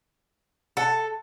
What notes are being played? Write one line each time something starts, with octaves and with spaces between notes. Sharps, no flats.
A4 F#5 G#5 A5